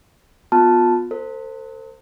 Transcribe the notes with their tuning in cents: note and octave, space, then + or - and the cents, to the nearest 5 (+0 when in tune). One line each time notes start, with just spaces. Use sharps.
B3 +0 F4 +35 A5 +0
A4 +45 C5 +0